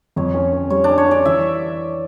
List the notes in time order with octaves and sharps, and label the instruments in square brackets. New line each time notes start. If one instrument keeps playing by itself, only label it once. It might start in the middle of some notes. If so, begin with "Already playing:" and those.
[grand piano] F2 [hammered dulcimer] C#5
[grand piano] C#4
C#4
[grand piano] G3 [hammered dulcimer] C#5
[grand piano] C#4 [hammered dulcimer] D4
[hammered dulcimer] C#5
[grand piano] C#4 [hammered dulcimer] D5
[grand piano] E3 [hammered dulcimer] E5